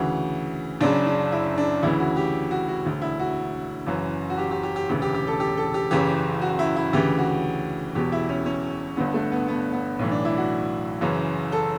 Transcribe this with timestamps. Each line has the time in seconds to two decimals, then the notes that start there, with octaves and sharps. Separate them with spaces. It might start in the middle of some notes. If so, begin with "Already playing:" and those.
Already playing: D2 C#3 E3 F#4
0.81 F#1 F#2 C#3 D4
1.06 D4
1.32 E4
1.58 D4
1.83 D2 C#3 E3 E4
2.00 F#4
2.17 G4
2.51 F#4
2.68 F#4
2.85 E1 D2 D3
3.02 E4
3.19 F#4
3.87 F#1 F#2 E3
4.30 F#4
4.38 G4
4.51 G4
4.63 G4
4.76 G4
4.89 E1 D2 C#3 E3
5.02 G4
5.14 G4
5.27 A4
5.40 G4
5.57 A4
5.74 G4
5.91 F#1 F#2 C#3 E3 G4
6.41 F#4
6.59 E4
6.76 E4
6.93 D2 C#3 E3 G4
7.18 F#4
7.95 E1 E2 B2 G4
8.12 E4
8.29 C#4
8.46 C#4
8.97 G1 G2 D3 B3
9.14 A3
9.32 B3
9.48 B3
9.73 B3
9.99 B1 A2 E3
10.11 D4
10.25 E4
10.37 F#4
11.01 F#1 F#2 C#3 E3
11.52 A4